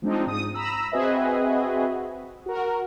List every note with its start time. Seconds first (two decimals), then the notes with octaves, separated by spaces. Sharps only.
0.02 F3 G#3 C4 D4 D#4
0.27 G#2 D#6
0.54 A#5 B5 E6
0.92 C4 F#4 G#4 B4 D#5 E5
2.46 F#4 A#4